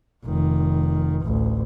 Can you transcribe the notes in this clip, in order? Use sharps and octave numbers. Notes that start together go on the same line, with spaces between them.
F1 D#3
A1 D2